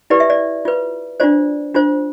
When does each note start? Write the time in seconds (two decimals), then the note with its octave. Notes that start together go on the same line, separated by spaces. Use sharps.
0.10 E4 G4 B4 D5
0.20 E5
0.30 D5
0.65 F4 B4
1.20 D4 F4 C5 D5
1.74 D4 F4 C5